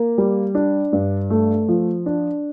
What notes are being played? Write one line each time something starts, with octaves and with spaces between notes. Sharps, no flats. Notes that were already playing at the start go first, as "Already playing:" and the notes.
Already playing: A#3
G3
D4
G2
A3
F3
D4